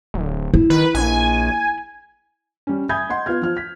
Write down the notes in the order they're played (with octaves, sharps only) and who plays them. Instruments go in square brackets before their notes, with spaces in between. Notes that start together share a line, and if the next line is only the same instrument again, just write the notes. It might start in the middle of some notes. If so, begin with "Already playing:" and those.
[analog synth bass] D1
[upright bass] E4
[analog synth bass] D#3 [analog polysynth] B4
[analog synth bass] A#1 [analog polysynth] G#5
[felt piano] G3 C#4
E5 G#5 B5 D#6 G6 G#6
D#5 F#5 C6
B3 F4 C6 F6 G#6
F3 F6
B6